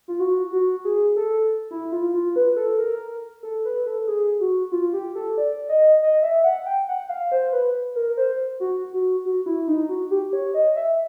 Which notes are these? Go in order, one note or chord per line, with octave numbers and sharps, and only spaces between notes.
F4
F#4
F#4
G#4
A4
E4
F4
F4
B4
A4
A#4
A4
B4
A4
G#4
F#4
F4
G4
A4
D5
D#5
D#5
E5
F#5
G5
F#5
F5
C5
B4
A#4
C5
F#4
F#4
F#4
E4
D#4
F#4
G4
C#5
D#5
E5